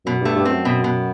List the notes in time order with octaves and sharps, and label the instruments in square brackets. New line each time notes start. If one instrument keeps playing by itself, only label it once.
[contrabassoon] F#2 [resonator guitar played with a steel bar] B2
[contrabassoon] G2 [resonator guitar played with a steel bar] A3
[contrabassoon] G2
[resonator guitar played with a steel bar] C4
[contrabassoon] F#2
[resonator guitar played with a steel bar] B2
B2